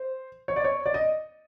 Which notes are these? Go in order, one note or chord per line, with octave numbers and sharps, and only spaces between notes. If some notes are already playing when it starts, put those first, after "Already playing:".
Already playing: C5
C#5
D5
C#5
D5
D#5